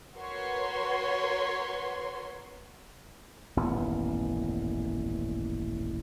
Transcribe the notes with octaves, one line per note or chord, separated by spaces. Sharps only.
F#4 A#4 B4 C#5 C6
D#1 A1 F#2 B3